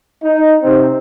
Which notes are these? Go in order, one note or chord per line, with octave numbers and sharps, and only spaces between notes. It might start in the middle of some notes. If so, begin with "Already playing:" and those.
D#4
C3 C4